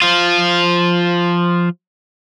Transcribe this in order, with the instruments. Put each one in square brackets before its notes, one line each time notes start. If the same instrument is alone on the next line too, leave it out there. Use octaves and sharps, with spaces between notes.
[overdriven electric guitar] F3 F4